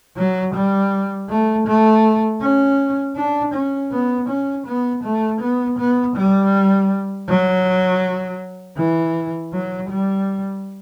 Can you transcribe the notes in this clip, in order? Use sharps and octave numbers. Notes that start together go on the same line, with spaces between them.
F#3
G3
A3
A3
C#4
D4
C#4
B3
C#4
B3
A3
B3
B3
G3
F#3
E3
F#3
G3